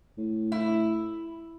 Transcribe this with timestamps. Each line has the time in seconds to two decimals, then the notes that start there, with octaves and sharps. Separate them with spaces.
0.17 A2
0.52 E4